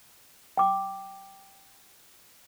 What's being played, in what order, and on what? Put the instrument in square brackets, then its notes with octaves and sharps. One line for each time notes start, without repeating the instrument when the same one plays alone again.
[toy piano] G5 D6